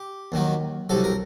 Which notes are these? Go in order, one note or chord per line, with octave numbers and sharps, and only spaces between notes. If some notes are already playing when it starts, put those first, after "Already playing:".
Already playing: G4
D#2 D#3 F#3
C2 C3 F#3 A4
A#4